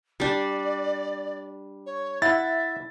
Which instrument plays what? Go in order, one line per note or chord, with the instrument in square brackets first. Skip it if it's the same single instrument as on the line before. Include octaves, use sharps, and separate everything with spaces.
[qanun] G3 D4 [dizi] D5
[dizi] C#5
[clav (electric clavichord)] E4 F#5 [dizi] E5 [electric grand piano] A6